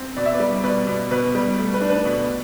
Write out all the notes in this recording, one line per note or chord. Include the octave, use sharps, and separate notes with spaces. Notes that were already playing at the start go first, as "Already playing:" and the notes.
Already playing: C4
B2 D5
E5
B4 D5
G3
B2 B4 D5
B2
B2 B4
G3
A3
B4
D4
B4
B2